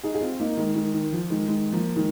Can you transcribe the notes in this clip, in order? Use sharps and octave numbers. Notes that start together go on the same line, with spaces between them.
D#4 G#4
G#4
C4 F4
A#3 D#4
D#3 G#3
D#3 G#3
D#3
F3
D#3 G#3
D#3 G#3
F3 A#3
D#3 G#3